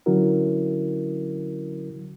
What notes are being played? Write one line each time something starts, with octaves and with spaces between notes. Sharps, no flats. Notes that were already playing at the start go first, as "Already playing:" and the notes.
D3 F#3 C#4 E4 F#4 A#4